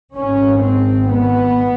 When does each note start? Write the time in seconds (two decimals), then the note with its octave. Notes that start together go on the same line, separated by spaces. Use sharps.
0.14 G#1 G#2 C#4
0.61 C4
1.08 B3